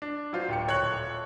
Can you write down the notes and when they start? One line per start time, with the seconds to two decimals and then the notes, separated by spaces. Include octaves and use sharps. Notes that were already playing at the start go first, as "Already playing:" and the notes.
0.02 D4
0.33 F#3 F4 C5
0.49 D1 G4 C#7
0.67 D#1 A4 C#5 C#6 F#6 F#7